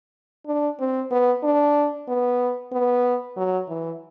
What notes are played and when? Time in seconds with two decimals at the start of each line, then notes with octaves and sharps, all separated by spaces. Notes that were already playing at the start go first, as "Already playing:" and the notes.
0.46 D4
0.80 C4
1.11 B3
1.43 D4
2.08 B3
2.73 B3
3.37 F#3
3.69 E3